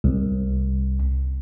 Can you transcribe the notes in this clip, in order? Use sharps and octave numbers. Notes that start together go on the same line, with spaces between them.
C2